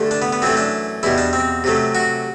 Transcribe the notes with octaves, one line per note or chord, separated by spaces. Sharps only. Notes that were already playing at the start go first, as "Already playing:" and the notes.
Already playing: G2 D3 A3
D4
B3
B3
F#2 E3 A3 C4
D4
E2 B2 G3 E4
D4
C4
C3 F#3 A3
F#4